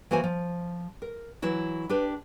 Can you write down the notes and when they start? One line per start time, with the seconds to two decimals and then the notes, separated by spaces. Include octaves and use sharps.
0.11 E3 A#3 F#4 C5 G#5
0.24 F3
1.02 A#4
1.42 E3 F#3 E4 F#4
1.89 D4 G4 B4